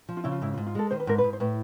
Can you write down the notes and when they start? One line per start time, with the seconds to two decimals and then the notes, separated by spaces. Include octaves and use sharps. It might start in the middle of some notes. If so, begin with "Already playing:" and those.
0.09 F3
0.17 F4
0.24 C#3 E4
0.32 F4
0.42 G#2 E4
0.54 F4
0.58 G#2
0.66 F4
0.75 G#3 A4
0.90 D#3 C5
1.00 B4
1.07 G#2 A#4
1.18 B4
1.24 G#2
1.33 C5
1.40 A2 B4